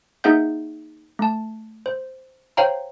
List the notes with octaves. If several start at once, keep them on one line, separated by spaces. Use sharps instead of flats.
A#3 D#4 G#4 E5 F#5 G6
A3 A5
C5
C5 C#5 F5 G5 A#5